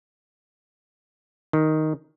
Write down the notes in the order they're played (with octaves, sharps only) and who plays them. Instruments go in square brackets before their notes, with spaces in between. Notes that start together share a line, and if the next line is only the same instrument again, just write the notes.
[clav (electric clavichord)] D#3